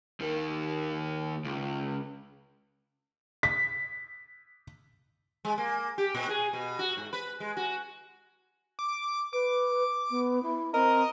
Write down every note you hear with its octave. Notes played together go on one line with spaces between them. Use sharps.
D#2 D#3
C#2
B6
G#3
A#3
G4
A#2
G#4
B2
F#4
G#2
B4
G#3
F#4
D6
B4 D6
B3
E4
C4 A#4 D#5